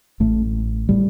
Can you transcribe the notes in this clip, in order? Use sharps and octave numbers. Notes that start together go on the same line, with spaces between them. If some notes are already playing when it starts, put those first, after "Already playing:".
A1 A2 A3
A2 G3